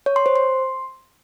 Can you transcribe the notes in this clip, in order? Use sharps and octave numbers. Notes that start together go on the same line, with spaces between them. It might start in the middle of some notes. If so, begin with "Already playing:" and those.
C#5
C6
C5
C6